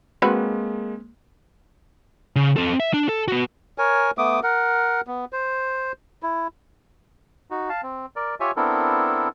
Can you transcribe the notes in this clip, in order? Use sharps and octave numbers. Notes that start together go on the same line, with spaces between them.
G#3 A#3 C4 F#4 B4
C#3
C4 A4
E5
D4
A4
B3 F#4
A#4 C#5 G#5
A3 B3 D6 D#6
A#4 F#5
B3
C5
E4
D#4 F#4
F5 A5
C4
A#4 D5
F4 G4 C#5 E5 G#5
B3 C4 D4 E4 A4 A#4